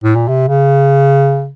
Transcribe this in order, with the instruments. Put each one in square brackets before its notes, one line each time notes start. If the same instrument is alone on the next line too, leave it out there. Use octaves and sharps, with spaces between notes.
[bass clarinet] A2
A#2
C3
C#3